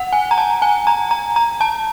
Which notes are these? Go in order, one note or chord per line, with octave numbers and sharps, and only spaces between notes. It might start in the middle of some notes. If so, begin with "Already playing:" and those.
Already playing: F#5
G#5
A#5
A5
G#5
A#5
A#5
A#5
A5